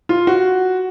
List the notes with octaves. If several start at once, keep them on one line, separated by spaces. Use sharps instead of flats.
F4
F#4